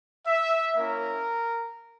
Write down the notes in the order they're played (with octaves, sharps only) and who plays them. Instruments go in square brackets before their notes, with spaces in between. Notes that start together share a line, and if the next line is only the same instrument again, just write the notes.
[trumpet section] E5
A#3 C#4 E4 A#4